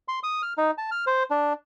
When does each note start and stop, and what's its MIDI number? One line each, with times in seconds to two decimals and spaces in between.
0.08 0.19 84
0.23 0.42 87
0.43 0.53 89
0.58 0.71 63
0.78 0.90 81
0.91 1.05 89
1.07 1.23 72
1.30 1.53 62